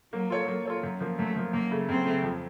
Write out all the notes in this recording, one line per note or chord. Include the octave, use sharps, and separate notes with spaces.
F#3 A#3
F4 A4 C#5
A#3
F4 A4 C#5
F#2
F3 A#3
F#2 A3
F3 A#3
F#2 A#3
C#3 A3
F#2 C4
C#3 A3
F2